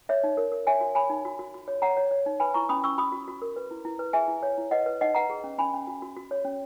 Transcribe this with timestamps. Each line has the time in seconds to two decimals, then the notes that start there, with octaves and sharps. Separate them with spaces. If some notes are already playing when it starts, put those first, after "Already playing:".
0.09 C#5 E5
0.24 D#4
0.37 A#4
0.52 A#4
0.67 C#5 E5 G#5
0.81 F#4
0.95 C#5 G#5 B5
1.10 D#4
1.25 F#4
1.39 F#4
1.54 F#4
1.68 C#5
1.82 C#5 F#5 A#5
1.97 C#5
2.11 C#5
2.26 D#4
2.40 B4 G#5 B5
2.54 E4 A#5 C#6
2.69 C#4 B5 D#6
2.84 C#4 C#6 E6
2.98 F#4 B5 D#6
3.12 F#4
3.28 F#4
3.42 A#4
3.56 B4
3.71 E4
3.85 E4
3.99 B4
4.13 G#4 E5 G#5
4.28 E4
4.43 C#5
4.58 E4
4.71 B4 D#5 F#5
4.86 B4
5.01 D#4 D#5 F#5
5.15 B4 F#5 A#5
5.30 G#4
5.44 C#4
5.58 C#4 G#5 B5
5.73 C#4
5.87 F#4
6.02 F#4
6.16 F#4
6.31 C#5
6.45 C#4